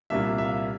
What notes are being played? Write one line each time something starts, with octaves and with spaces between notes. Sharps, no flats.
C2 A#2 G3 A#3 D4 E5
E5
F5
E5